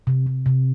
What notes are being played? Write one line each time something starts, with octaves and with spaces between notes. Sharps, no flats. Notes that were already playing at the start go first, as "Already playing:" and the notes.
C3
C3
C3